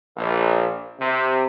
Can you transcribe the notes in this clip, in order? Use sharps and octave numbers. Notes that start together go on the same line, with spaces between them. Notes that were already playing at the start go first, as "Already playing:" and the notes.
A#1
C3